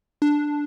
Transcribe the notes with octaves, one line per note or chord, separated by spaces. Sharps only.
D4